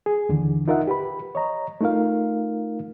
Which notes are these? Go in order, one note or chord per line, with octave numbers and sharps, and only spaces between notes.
G#4
D#2 D3 E3
D#4 F4 A#4 D#5 E5 F#5
G4 B4 B5
C#5 D#5 A#5
A3 D#4 F4 A#4 F5